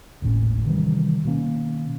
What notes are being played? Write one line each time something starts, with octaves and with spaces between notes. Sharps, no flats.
D#1 G#1 A2 C#4
C3 D#3 E3 G3
B2 D#3 A#3 C#4